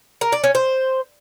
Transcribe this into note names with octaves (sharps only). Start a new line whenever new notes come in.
A#4
D5
C#4
C5